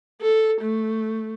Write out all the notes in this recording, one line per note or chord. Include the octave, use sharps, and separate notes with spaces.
A4
A3